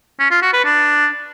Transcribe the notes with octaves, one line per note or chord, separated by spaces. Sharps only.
C#4
F4
F#4
B4
D4